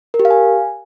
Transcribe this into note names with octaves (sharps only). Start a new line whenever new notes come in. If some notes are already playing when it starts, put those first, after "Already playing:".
A#4
G4
F5
G#5